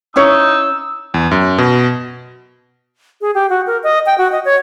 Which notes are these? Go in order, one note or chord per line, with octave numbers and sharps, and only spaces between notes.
C#4 D#4 E4 C#5 E6
E2
F#2
B2
G#4
G4
F#4
A#4
D#5
G5
F#4
D#5
C#5